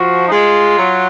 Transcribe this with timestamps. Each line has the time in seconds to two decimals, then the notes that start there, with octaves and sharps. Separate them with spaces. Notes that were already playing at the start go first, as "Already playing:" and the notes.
Already playing: F3 F#4
0.28 D#4
0.32 G#3 F4
0.78 F#3